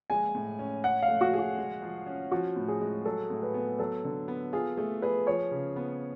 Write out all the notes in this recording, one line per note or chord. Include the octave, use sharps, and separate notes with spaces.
G#3 G#5
A2
C#4
C#4 F#5
F5
A3
F#4
G#4
F#4
G#3
F3
C#4
F3 F#4
A2
G#4
G#3
F#3 A4
A2
B4
B3
F#3 A4
D3
B3
F4 G#4
A3 G#4
G#4 B4
F3 C#5
C#3
B3